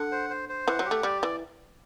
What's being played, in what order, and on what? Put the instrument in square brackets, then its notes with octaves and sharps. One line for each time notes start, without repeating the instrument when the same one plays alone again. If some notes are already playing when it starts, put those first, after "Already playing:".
Already playing: [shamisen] D3 [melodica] F#5
[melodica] C5
C5
C5
[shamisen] E3 [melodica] F#5
[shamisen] F#3
[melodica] G4
[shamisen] A3
[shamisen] G3 [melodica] D5
[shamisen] E3 [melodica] D5